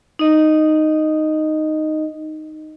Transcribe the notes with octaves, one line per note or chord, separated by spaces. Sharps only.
D#4 D#5